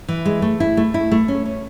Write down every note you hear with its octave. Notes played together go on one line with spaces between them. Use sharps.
E3
G#3
A3
E4
A3
E4
A3
C#4
C#4